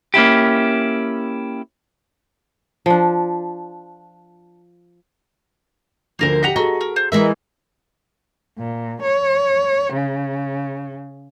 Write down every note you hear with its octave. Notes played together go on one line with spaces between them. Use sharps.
A#3 C#4 E4 G4
F3 D4
D2 D3 F3 A#3 A#4 C5
G4 D#5 F#5 A#5 B6
F#4 G#4 A4 D#5 A#5
A#4
C5
E3 G#3 A#4 E5
A#2
C#5
C#3